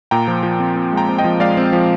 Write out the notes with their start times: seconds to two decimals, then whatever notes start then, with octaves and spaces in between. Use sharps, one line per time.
0.11 A#2 G5 A#5
0.28 F3
0.43 F3
0.60 C4
0.76 C4
0.93 G#3 G5 A#5
1.09 C4
1.18 D#5 G5
1.24 F3
1.40 G#3 D5 F5
1.57 C4
1.73 F3